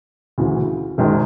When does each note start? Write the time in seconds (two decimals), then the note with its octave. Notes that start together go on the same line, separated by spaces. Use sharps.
0.38 D2 C#3 E3
0.98 F#1 F#2 D#3 G#3